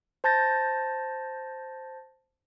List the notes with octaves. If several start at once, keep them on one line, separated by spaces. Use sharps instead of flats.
C5 A5 G6 A6 A#6